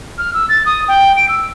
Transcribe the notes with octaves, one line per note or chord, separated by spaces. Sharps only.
F6
E6
A6
D#6
G5
D7
E6